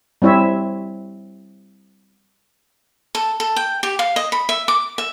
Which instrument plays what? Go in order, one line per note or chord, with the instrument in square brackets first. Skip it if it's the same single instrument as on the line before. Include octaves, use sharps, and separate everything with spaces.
[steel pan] G3 C4 E4 C#5 E5
[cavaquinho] A4
A4
G5
G4
F5
D#5
B5
E5
D6
E5